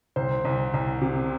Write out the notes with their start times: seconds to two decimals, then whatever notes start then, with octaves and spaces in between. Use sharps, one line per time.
0.16 C2 C5
0.45 C2
0.74 C2
1.01 C3